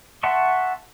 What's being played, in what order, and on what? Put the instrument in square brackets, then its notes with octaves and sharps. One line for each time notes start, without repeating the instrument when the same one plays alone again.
[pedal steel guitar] E5 F#5 A5 C6 C#6